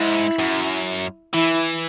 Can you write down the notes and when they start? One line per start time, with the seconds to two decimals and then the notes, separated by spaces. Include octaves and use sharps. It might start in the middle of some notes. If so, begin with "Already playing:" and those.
Already playing: G#2 E4
0.39 F#2
1.34 E3 E4